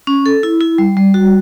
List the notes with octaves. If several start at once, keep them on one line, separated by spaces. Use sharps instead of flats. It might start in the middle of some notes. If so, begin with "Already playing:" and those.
C#4
A4
E4
E4
G3
G3
F#4